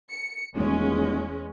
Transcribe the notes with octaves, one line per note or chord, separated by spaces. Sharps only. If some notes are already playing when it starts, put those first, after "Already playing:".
C#7
D#1 E2 G#3 C#4